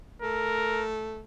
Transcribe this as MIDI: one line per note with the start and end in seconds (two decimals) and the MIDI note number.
0.22 1.23 57
0.22 0.85 70